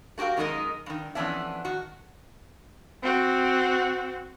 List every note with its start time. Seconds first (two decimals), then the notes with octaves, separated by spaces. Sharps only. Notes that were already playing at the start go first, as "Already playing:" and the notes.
0.18 A3 F#4 G4 A#4 F5
0.37 F#2 D#3 G#3 D#4 A#4 D#5
0.86 G2 D#3
1.15 F2 E3 B3 C#4 D4 E5
1.65 D#3 F#4
3.03 C4 F#4